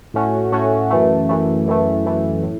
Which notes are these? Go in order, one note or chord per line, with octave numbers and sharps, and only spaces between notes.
A2 A3 C#4 F#4
A2 A3 C#4 F#4
F#2 E3 A3
F#2 E3 A3
F#2 E3 A3
F#2 E3 A3
A2